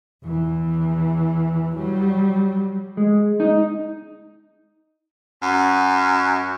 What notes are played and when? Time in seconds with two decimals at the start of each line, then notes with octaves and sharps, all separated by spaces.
0.24 E2 E3
1.77 F#3 G3
2.97 G#3
3.40 D#4
5.42 F#2